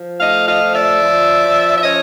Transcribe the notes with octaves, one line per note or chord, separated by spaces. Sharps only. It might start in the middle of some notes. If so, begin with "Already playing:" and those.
Already playing: F3
A3 D#5 F5
D#5 F5
F3
D5 E5
F3
F3
E5
C#4 C#5 D#5